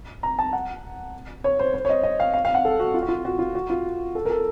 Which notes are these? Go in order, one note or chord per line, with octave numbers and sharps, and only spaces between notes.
A#5
A5
F#5
C#5
C5
C5
C#5
D#5
D#5
F5
F5
F5
F#5
A4
F#4
F4
F#4
F4
F#4
F4
F#4
F4
A4
A#4
A4